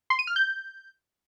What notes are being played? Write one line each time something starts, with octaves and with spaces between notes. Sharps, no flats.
C6
D#7
F6
G6